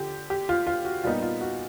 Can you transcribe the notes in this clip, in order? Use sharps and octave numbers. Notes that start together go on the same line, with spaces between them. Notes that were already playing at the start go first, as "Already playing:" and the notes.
Already playing: D3 F3 G4
G4
F4
F4
F#4
A#2 G3 B3 D#4 F4
F4
F#4